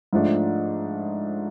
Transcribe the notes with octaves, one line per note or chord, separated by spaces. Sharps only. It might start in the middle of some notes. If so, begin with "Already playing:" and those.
G#2 F3 A3 D4